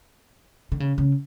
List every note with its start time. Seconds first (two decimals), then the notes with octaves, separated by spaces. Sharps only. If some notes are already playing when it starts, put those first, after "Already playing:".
0.72 D3
0.80 C#3
0.98 C#3